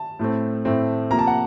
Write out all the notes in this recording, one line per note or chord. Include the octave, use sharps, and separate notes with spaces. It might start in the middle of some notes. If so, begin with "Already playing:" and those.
Already playing: A5
A2 A3 C4
A2 A3 C4
C3 F3 A#3 A#5
A5
F#5